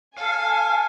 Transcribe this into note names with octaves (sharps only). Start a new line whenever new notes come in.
A4 F5 G#5